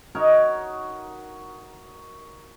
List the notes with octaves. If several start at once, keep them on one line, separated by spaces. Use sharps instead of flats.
D#4 F#4 A#4 C#5